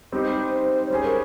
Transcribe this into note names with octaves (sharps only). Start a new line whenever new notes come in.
G3 C4 D#4 G4 C5
C#5
G3 C#4 G#4 C5
A#4